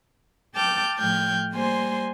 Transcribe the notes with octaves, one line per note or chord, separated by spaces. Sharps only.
G5 A5 D6 F6 G6
A2 F3 G5 F6 G6 G#6
G3 A#3 C5 G#5 C6